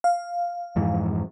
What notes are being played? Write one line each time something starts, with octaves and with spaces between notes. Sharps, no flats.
F5
F2 G#2 E3